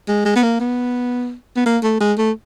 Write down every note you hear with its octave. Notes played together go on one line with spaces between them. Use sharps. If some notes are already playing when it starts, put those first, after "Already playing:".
G#3
G#3
B3
A#3
B3
B3
A#3
A3
G#3
A3